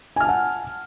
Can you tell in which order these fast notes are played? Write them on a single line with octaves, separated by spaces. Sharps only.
G#5 F6 A5 F#5